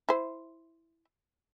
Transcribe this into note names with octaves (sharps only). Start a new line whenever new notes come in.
E4 C5